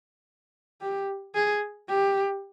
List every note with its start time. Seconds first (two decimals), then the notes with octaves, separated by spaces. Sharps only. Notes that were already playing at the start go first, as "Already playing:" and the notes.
0.81 G4
1.35 G#4
1.89 G4